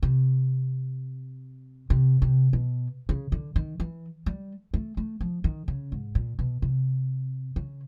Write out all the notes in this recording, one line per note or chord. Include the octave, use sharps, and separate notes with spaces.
C3
C3
C3
B2
C#3
D3
D#3
E3
G3
A3
A3
F3
D#3
C#3
G#2
A#2
B2
C3
C#3